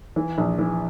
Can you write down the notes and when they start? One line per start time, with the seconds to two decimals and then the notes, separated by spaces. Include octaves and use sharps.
0.16 E3
0.38 A#1
0.58 E3